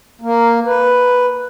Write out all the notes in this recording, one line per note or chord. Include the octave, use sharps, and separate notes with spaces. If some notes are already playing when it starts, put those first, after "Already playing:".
A#3
B4